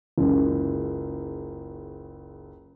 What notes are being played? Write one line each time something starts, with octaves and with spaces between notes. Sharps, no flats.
F#1 C#2